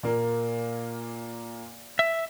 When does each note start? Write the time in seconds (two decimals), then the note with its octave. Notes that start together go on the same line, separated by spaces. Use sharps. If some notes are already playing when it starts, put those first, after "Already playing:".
0.03 A#2 A#3
1.99 E5